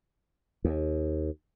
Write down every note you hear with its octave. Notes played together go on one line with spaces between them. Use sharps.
D#2